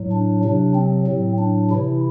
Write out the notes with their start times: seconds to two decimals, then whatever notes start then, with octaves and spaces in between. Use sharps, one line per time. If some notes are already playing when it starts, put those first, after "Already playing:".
Already playing: A2 F#3
0.11 D4
0.44 C3 F#3 D4
0.75 C4
1.07 A2 F#3
1.38 D4
1.70 C3 E3 E4